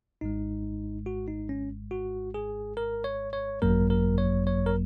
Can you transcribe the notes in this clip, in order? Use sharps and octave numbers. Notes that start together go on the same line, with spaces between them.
G#1 G#2 G#3 D#4
F#4
D#4
C#4
F#4
G#4
A#4
C#5
C#5
G#1 F#2 F#3 A#3 A#4
A#4
C#5
C#5
A#4